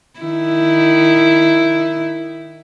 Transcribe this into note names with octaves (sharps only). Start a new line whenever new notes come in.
D#3 E4